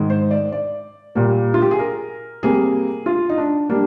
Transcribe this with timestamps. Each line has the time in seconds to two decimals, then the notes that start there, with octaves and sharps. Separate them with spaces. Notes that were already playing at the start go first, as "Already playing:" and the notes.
Already playing: G#2 D#3 G#3
0.10 C5
0.31 D5
0.52 D5
1.15 A#2 G3 A#3
1.54 F4
1.62 G4
1.71 G#4
1.79 A#4
2.43 C3 G3 A#3 G#4
3.06 F4
3.29 D#4
3.38 D4
3.69 G3 A#3 D4